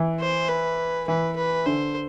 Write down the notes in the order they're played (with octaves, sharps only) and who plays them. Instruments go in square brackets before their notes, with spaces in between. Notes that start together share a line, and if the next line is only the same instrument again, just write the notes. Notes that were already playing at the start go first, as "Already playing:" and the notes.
Already playing: [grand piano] E3
[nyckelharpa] C5
B4
[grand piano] E3 [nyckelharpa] B4
[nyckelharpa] B4
[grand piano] D3 [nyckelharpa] C5